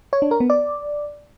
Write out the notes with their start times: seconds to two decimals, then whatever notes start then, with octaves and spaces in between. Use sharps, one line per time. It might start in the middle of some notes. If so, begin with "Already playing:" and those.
0.13 C#5
0.22 D4
0.31 A#4
0.40 B3
0.50 D5